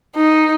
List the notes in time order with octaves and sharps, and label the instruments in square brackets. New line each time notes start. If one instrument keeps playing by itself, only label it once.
[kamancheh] D#4